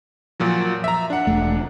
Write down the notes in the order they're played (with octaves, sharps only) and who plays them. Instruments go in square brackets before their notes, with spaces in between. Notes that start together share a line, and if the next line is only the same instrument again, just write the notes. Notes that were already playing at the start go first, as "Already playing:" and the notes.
[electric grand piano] A#2 F3 F#3
E5 A#5
D4 F#5
[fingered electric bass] E1 A3